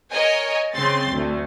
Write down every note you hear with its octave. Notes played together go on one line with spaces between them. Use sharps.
A#4 C#5 D#5 G#5
C#3 C4 C6 A6
D2 A3